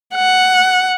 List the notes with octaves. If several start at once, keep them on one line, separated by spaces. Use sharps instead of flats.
F#5